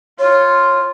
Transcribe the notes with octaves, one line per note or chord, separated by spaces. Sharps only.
F4 C#5